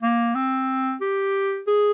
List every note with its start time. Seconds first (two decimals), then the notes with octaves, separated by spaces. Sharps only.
0.02 A#3
0.35 C4
1.01 G4
1.67 G#4